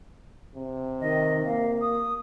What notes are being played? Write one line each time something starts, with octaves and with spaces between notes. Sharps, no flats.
C3
D#3 D#5
A#3 F5
D#6